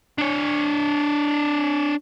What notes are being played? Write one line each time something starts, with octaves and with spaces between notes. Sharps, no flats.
D4 C#5